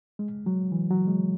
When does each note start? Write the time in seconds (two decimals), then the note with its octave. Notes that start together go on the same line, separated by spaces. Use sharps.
0.19 G#3
0.46 F#3
0.72 E3
0.91 F#3
1.07 G#3